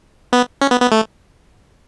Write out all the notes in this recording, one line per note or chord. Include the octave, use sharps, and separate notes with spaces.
B3
C#4
B3
B3
A3